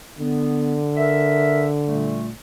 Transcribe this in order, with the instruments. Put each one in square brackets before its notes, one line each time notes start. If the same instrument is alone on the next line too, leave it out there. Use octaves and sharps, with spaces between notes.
[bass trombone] D3 [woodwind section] B3
[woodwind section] A#4 E5
A#2 G3 A3